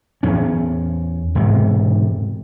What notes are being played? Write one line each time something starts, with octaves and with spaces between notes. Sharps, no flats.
E2 C#4
E1 G#2 C3